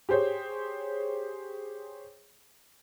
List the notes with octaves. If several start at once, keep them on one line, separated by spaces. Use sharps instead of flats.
G4 G#4 C5 C#5